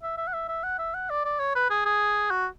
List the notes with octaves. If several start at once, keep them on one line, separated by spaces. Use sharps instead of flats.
E5
E5
F#5
E5
E5
F#5
E5
F#5
D5
D5
C#5
B4
G#4
G#4
F#4